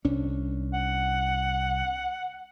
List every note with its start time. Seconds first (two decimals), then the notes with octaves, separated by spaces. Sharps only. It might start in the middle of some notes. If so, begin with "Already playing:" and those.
0.05 C2 C#4 D4
0.74 F#5